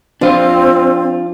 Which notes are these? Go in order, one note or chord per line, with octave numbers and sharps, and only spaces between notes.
F3 C4 D4 F4